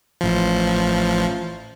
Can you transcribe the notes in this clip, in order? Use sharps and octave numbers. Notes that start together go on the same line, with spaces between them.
A1 F3